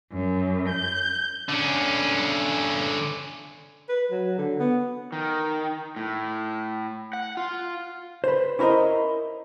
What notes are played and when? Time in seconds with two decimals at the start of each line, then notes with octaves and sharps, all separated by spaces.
0.12 F#2
0.70 G6
1.49 D3 C#4
3.89 B4
4.11 F#3
4.38 D3
4.59 B3
5.12 D#3
5.96 A2
7.13 F#5
7.37 F4
8.24 B4 C5
8.59 C#4 E4 A#4 C5 D#5